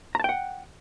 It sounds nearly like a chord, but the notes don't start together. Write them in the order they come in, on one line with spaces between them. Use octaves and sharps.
A#5 A5 G5 F#5